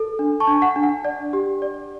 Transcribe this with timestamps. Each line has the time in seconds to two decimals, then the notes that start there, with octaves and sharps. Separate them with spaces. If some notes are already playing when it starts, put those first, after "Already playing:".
Already playing: A4
0.19 D4
0.40 A5 C#6
0.47 D4
0.62 F#5
0.76 D4
0.83 F#5
1.05 D5
1.33 G4
1.62 D5